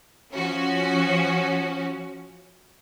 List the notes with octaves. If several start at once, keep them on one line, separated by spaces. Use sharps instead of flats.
F3 C#4 F#4